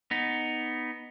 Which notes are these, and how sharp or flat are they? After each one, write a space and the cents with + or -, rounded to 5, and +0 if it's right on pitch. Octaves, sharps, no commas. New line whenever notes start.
B3 +0 D#4 -5